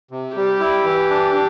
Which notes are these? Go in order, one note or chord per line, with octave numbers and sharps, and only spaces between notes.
C3
G3 G4
E4
E3
D4
D4